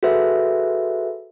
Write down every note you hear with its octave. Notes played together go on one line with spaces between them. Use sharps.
F#4 G#4 A4 B4 C5 E5